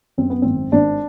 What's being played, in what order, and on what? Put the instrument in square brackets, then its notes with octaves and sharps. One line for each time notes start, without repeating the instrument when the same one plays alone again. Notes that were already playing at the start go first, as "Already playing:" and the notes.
[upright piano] F#2 C4
B3
G#1 C4
G#1 D4